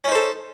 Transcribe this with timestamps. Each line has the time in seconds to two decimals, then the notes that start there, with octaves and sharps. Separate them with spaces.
0.04 C#4
0.08 D#4
0.11 C5
0.15 A4